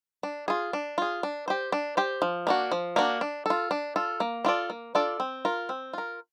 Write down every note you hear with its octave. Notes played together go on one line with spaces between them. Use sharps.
D4
F4 G#4
D4
F4 G#4
D4
G4 C5
D4
G4 C5
F3
A#3 D4 F#4
F3
A#3 D4 F#4
D4
F4 A4
D4
F4 A4
A#3
D4 F4 A4 D5
A#3
D4 F4 A4 D5
C4
F4 A#4
C4
F4 A#4